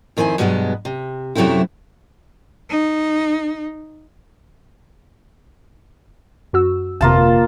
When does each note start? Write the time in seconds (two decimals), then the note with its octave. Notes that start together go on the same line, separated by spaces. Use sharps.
0.17 F2 D#3 C4 E4 G#5
0.38 G2 B2 F#3 G#3 B3
0.85 C3
1.35 F#2 C3 F#3 A3 C4 E4
2.70 D#4
6.53 F#2 F#4 E6
7.01 G1 F2 C3 A#3 F4 A5